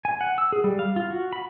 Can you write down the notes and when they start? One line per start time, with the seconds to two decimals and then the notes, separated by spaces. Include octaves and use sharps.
0.05 G#5
0.21 F#5
0.38 E6
0.52 G#4
0.64 G3
0.79 F5
0.96 F4
1.10 F#4
1.33 B5